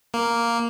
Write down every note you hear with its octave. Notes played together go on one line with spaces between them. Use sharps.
A#3